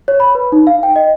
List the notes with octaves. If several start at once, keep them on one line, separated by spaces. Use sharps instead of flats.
C#5
B5
B4
D#4
F5
G5
D#5